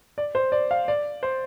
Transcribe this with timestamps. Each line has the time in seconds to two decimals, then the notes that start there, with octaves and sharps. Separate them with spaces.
0.18 D5
0.35 C5
0.52 D5
0.71 F5
0.88 D5
1.23 C5